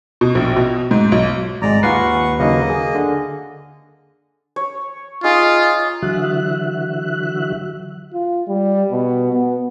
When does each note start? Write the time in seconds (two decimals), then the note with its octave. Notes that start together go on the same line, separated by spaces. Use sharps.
0.21 B2
0.35 A#1
0.56 B2
0.91 G#2
1.12 B1
1.62 G#1 G#3 D5 A#5
1.83 D#2 F4 B4 F5 F#5 G#5 C#6 C7
2.39 C#3 F#3 A#3 D#4 D#5
2.70 G#4
2.95 D3
4.56 C#5
5.24 D#4 F4 G#4
6.02 D3 E3 F#3 F#4 E5 F#6
8.13 F4
8.48 G3
8.91 B2
9.32 B3